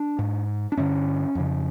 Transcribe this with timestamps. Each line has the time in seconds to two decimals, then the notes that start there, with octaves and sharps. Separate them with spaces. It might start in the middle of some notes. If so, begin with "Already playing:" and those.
Already playing: D4
0.19 G#2
0.72 D4
0.77 G2 D3 C#4
1.35 F2 C#3